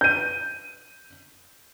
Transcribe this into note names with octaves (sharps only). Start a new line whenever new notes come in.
G6 D#7